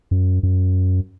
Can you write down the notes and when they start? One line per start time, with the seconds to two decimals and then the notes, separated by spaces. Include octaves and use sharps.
0.11 F#2
0.43 F#2